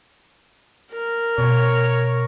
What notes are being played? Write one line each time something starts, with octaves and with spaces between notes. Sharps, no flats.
A#4
B2 C#5